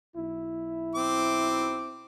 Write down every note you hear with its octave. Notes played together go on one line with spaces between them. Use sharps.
B1 E4
C4 D6